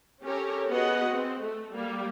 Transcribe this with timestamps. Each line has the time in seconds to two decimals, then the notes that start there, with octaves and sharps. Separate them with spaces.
0.22 C#4 G4 A4 A#4 C#5
0.69 B3 F#4 G#4 B4 D#5 F#5
1.11 C4
1.41 A3
1.74 G3 A#3